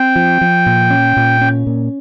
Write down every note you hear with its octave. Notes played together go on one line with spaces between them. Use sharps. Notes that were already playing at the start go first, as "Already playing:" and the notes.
Already playing: C4 G5
F3
F3
A#2
C#4
A#2
C#4
A#2